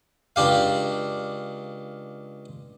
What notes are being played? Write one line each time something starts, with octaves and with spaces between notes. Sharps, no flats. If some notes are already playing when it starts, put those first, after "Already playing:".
C#2 D4 G4 F5